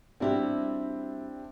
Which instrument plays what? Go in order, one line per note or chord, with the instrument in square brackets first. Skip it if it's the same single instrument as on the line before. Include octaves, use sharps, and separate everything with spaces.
[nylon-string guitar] G3 E4 F#4 [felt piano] C4 D4 G4